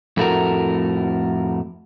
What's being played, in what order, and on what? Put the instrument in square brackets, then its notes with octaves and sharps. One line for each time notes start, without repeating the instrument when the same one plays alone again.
[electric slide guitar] F2 A2 A3 F#4 A#4